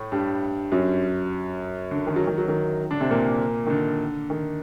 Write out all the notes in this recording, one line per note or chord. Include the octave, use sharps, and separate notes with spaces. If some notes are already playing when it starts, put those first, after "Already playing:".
Already playing: A2 A3
G2 G3
F#2 F#3
D3
D#3
F#3
D#3
F#3
D#3
D3 D4
C3 C4
A#2 A#3
D#3
D3
D#3